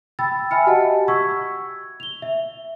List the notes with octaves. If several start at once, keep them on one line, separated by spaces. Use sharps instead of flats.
G5 B5 E6 A6
E5 G#5 B5 F6 C#7
F#4 G4 D#5 F#5 A5
C#6 E6 G#6 B6
F7 G7
E5